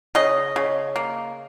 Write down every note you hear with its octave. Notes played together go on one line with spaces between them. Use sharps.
C#3 D#5
C#3
A#3